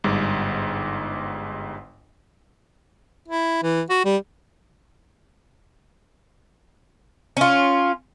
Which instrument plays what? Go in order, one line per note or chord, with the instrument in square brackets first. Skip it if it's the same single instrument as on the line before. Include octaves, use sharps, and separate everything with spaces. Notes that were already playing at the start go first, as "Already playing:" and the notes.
[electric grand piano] G1 G#2 G3
[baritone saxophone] E4
E3
F#4
G3
[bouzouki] C#4 F4